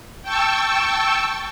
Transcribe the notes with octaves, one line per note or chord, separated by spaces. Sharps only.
G5 A5 C#6 E6